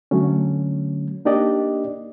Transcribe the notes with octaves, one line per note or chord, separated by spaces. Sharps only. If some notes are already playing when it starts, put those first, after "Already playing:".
D3 F#3 A3 C#4
A#3 D4 D#4 G4 D5 D#5